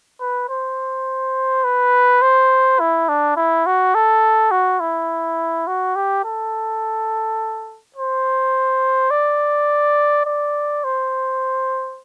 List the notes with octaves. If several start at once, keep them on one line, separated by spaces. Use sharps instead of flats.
B4
C5
B4
C5
E4
D4
E4
F#4
A4
F#4
E4
F#4
G4
A4
C5
D5
D5
C5